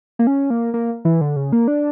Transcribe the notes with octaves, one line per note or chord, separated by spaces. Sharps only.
A#3
C#4
A#3
A#3
E3
D3
C#3
A#3
D4